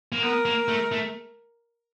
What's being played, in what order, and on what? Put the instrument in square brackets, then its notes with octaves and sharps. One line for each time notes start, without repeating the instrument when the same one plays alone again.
[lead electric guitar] A#3
[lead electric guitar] B3 [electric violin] A#4
[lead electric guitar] A#3
A3
A3